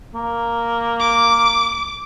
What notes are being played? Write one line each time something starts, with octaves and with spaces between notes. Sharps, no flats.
A#3
D6